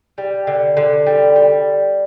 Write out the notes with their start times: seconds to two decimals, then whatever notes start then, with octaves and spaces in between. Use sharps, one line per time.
0.18 G3
0.47 D3
0.77 D3
1.06 G3
1.36 G3